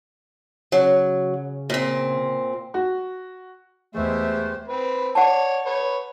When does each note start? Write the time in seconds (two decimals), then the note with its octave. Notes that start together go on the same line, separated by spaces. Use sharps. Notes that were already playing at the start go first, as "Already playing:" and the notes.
0.72 C#3 F#3
1.70 A#2 C4
2.74 F#4
3.95 E2 G#3 A3 G4 C5 E5
4.67 C4 B4
5.15 C#5 D5 F#5 A5
5.66 B4 C#5